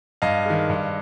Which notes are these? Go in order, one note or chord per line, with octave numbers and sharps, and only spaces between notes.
G2 D#5 F5
D#3 G#3
G2